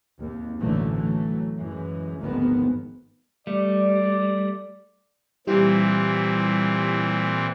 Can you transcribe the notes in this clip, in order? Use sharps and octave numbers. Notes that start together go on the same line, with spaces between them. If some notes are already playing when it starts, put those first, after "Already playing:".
G#1 D#2
A1 B2 D3 E3 F#3 A3
E3 F#3 A3
F#2 E3 G#3
G#1 D2 D#3 F3 G#3 B3
G3 A3 D5
A#2 E3 G3 C4 E4 G4